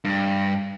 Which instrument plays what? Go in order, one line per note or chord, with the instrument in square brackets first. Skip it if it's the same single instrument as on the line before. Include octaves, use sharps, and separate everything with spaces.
[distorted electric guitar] G2